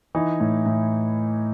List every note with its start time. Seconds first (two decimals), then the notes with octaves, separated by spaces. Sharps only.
0.15 E3 D#4
0.40 A2
0.66 A2